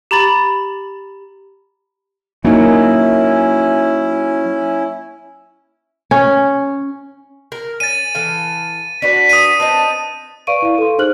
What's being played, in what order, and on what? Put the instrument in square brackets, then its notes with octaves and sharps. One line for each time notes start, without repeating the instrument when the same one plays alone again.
[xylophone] G4 A#5 B5 A6 F#7
[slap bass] F#3 [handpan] A#3 D#4 [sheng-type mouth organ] C#4 E4
[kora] C#4
[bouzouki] A#4
[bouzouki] C#4 [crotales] A6 D#7
[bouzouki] E3 A4 F5
[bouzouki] D4 F#4 B4 [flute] B6
[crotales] D#6 D#7
[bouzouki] C4 D#4 B4 [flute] A5
[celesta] B4 D5 F5 C#6 D7 D#7
E4 F5
A4 C6
D#4 G#4 C5 F6 F#6 F#7